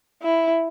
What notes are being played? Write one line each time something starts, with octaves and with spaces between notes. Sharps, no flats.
E4